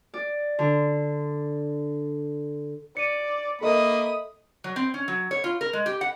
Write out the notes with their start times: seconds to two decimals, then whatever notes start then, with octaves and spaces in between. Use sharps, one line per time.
0.14 D5
0.59 D3
2.97 D5 C#7 D#7
3.61 A#3 A4 D#5 E5 B5 D#6
4.64 F#3
4.76 C4
4.94 C#4
5.08 F#3
5.31 C#5
5.44 F4
5.61 A#4
5.73 G#3
5.86 G4
6.01 F#5